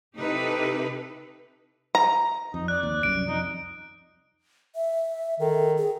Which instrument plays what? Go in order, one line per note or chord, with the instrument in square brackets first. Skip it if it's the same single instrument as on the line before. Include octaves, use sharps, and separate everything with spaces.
[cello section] C3 D#4 E4 G4 A4 B4
[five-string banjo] A#5
[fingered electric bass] F2 [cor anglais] D#4
[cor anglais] D5 [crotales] F#6
[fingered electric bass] D#2
[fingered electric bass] C2 F#2 [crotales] D7
[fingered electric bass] F2 [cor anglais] D#4
[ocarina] E5
[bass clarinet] D#3 [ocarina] A4
[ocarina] G#4